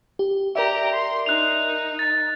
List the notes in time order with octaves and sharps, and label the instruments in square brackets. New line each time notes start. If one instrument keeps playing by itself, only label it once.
[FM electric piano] G4
[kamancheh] G4 A#5 [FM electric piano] A#4 D5 E5
[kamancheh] C6
[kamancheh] D#4 [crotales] F#6 F7
[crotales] A6